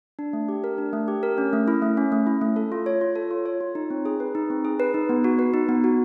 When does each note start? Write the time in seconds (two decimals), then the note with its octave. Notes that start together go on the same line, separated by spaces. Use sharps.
0.19 D4
0.33 A3
0.49 G4
0.64 A#4
0.78 D4
0.93 A3
1.08 G4
1.23 A#4
1.38 C#4
1.53 A3
1.68 E4
1.82 A3
1.97 C#4
2.12 A3
2.27 E4
2.41 A3
2.56 A4
2.72 F4
2.86 C#5
3.01 F4
3.16 A4
3.31 F4
3.46 C#5
3.61 F4
3.75 D#4
3.90 C4
4.05 G#4
4.20 B4
4.35 D#4
4.50 C4
4.65 G#4
4.80 B4
4.94 D#4
5.09 B3
5.24 F#4
5.39 B4
5.54 D#4
5.69 B3
5.84 F#4